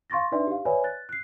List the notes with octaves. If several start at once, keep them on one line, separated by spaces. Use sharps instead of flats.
F5 C6 C#6 A6 A#6
D4 D#4 B4 D5 E5 C6
G4 F5
B4 C#5 D5 E5 G#5 B5
F#6 A6
F#6 C7